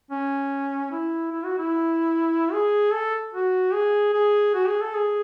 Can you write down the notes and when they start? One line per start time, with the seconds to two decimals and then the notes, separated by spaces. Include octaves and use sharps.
0.11 C#4
0.91 E4
1.32 E4
1.44 F#4
1.58 E4
2.52 G#4
2.93 A4
3.33 F#4
3.74 G#4
4.14 G#4
4.54 F#4
4.68 G#4
4.82 A4
4.95 G#4